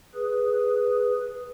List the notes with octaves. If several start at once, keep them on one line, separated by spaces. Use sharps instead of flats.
G#4 B4